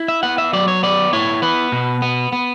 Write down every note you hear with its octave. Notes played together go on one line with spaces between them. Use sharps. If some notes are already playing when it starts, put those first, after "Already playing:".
Already playing: E4
E5
B3 F#5
E5
F#3 D5
C#5
B3 D5
E4 C#5
B3 B4
B2
B3
B3